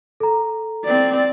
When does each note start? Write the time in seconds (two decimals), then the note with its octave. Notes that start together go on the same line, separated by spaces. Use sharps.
0.20 A4 A#5
0.85 C4 D5